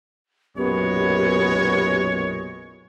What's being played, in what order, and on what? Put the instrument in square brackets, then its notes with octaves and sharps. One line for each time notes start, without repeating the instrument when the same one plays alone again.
[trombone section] B1 F#2 A#2 [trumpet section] G#3 C#5 [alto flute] B3 [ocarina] G4